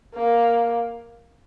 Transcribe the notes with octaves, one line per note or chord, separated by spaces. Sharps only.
A#3